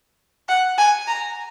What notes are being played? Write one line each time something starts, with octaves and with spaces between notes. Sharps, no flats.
F#5
G#5
A#5